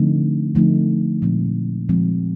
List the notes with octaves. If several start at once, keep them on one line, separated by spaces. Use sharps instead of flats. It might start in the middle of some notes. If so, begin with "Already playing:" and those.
Already playing: D3 F3 A3 C4 D#4
D3 F3 A3 C4 D#4
A#2 F3 G#3 C4
A#2 F3 G#3 C4